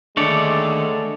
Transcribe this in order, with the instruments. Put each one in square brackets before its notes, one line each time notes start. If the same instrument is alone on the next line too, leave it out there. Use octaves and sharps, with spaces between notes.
[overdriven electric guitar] D#2 [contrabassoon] D3 [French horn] G#3 [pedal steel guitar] A3 C#5 D5